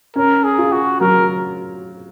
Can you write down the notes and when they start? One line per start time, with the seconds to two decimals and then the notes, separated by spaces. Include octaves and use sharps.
0.16 C#4 A#4
0.44 G#4
0.58 F4
0.72 F#4
1.00 F#3 A#4